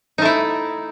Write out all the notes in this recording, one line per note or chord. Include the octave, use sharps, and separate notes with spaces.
A3 D#4 E4